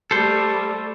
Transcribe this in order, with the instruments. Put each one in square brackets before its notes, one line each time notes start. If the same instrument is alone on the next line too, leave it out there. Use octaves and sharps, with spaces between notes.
[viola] G3 A3 [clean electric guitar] A4 C5